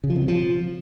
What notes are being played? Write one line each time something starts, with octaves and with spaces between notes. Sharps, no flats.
C#3
F3
C3
F#3
F3